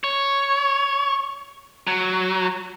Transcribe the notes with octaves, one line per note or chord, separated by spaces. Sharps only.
C#5
F#3